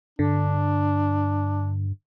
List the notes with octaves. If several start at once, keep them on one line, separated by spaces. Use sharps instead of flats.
G2 D3 D4